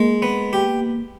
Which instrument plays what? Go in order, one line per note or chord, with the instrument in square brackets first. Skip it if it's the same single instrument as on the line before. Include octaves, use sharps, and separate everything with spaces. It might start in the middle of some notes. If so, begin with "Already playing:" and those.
Already playing: [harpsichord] G#3 [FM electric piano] A#3
[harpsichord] B3
G4